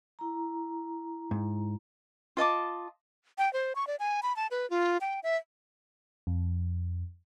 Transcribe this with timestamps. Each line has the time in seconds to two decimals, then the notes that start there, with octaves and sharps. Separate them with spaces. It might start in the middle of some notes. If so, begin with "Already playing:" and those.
0.19 E4 A#5
1.31 G#2
2.37 F4 D#5 A5 D6
3.38 G5
3.53 C5
3.75 C#6
3.87 D5
4.00 G#5
4.23 B5
4.36 A5
4.51 B4
4.70 F4
5.01 G5
5.23 E5
6.27 F2